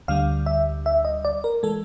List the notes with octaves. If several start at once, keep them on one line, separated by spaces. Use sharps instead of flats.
D2 D3 G3 F5
E5
E5
D#5
D5
A#4
E3 G#3 A4